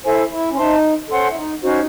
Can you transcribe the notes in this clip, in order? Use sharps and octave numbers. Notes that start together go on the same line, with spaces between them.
E4 A4 C5 E5 G#5
E4
C#4
D#4 C5 E5 A5 C6
C#4 A4 C5 F#5 C6
E4
D#4
C#4 D#4 F#4 C5